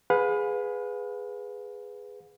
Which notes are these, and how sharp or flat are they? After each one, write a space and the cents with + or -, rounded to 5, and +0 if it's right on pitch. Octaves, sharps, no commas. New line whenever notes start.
G#4 +0 B4 +5 F5 +45